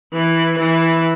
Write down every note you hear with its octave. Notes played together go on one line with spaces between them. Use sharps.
E3
E3